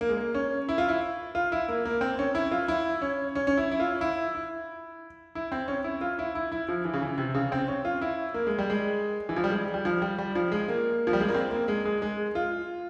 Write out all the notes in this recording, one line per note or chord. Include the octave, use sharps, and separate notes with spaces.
A#3
G#3
A#3
C#4
E4
F4
E4
F4
E4
A#3
A#3
C4
C#4
E4
F4
E4
C#4
C#4
C#4
E4
E4
F4
E4
E4
E4
C4
C#4
E4
F4
E4
E4
E4
F3
E3
C#3
E3
C3
C#3
C4
C#4
F4
E4
A#3
G#3
G3
G#3
E3
F3
G3
G#3
G3
F3
G3
G3
F3
G#3
A#3
F3
G3
G#3
A#3
C4
A#3
G#3
G#3
G#3
F4